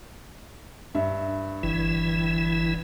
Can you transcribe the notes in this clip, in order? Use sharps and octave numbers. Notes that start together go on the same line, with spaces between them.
G2 E5
G1 E3 E4